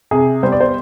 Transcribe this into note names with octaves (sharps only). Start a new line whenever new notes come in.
C3 G#4
G3 B3 C5
D5
C5